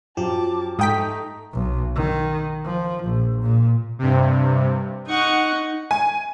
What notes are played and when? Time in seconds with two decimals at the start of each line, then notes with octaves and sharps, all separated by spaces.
0.17 F#2 F3 G4 A5 D6
0.79 G#2 A3 D#4 G5 A#5 D#6 B6
1.53 B1
1.96 D#3
2.65 F3
3.04 A#1
3.43 A#2
3.99 G2 C3
5.08 D#4 F#5 C#6
5.91 G#5